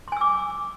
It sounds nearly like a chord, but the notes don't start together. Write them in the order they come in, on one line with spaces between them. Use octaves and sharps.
C6 G#5 E6 D6